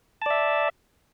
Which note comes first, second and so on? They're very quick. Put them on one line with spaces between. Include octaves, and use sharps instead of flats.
A5 D5 E5